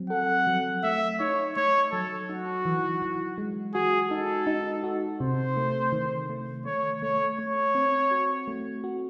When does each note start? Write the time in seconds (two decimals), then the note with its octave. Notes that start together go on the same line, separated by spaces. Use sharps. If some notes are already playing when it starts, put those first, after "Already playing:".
Already playing: F#3 C4
0.10 A4 F#5
0.47 F#3
0.84 A3 E5
1.20 D#4 C#5
1.57 A3 C#5
1.92 F#3 A4
2.29 D#4 F#4
2.65 E3
3.02 E3
3.38 G#3
3.74 F#4 G#4
4.10 D#4 A4
4.47 D#4
4.84 F#4
5.20 C3 C5
5.57 A3
5.92 D#3
6.30 A3
6.65 A3 C#5
7.02 A3 C#5
7.38 A3 C#5
7.75 C4
8.11 F#4
8.48 A3
8.84 F#4